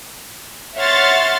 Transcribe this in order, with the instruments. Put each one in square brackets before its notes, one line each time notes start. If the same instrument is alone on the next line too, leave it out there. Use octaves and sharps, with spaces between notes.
[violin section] C#5 E5 F#5 C6 F6 A6